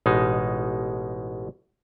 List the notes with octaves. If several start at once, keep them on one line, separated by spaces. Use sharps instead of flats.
A1 B2 G#3 D#4